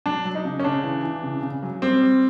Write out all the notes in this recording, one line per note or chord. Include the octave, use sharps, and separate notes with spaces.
F#3 D4
F#3
D#4
C#3
C#4
C#3 D4
E3
E3
C#3
C#3
F#3
G3 C4
G3